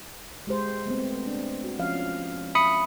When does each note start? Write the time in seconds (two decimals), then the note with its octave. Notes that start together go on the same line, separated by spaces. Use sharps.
0.47 G#3 G4 C5
0.86 A3 B3 C4
1.26 D4
1.64 F#4
1.79 F3 C#4 F5
2.55 E5 B5 D#6 C#7